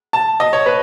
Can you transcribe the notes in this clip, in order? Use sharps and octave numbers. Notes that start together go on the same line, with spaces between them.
A5
D#5
C#5
B4